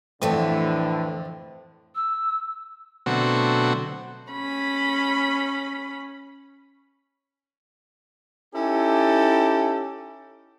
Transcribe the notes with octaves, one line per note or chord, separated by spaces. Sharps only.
F2 A2 D3 E3 A3 B4
E6
B2 D3 F#3 A3 C4 F#4
C#4 B5
C#4 D#4 E4 G4 A4